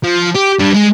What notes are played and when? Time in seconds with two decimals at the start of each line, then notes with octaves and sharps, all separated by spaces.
0.04 F3
0.35 G4
0.59 G3 D4
0.74 G#3